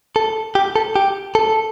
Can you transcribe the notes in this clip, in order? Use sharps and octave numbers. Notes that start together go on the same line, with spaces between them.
A4
G4
A4
G4
A4